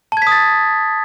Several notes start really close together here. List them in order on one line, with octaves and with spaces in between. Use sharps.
A5 G#6 B6 D#6 A6